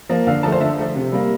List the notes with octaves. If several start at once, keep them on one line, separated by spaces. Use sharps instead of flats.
F3 A#3
D3 F5
F3 A3 A5
C5
D3 E5
F3 A3
C3
G3 A#3